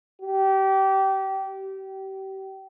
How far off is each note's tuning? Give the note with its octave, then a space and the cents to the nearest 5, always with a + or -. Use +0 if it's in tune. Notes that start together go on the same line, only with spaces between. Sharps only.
G4 -25
G4 -30